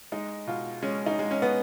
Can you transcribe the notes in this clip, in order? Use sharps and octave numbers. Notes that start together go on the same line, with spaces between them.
G#3 D#4
B2 F4
G#3 C#4
D#4
G#3
C#4
B3